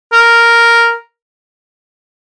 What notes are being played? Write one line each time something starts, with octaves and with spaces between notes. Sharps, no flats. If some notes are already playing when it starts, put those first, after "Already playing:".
A#4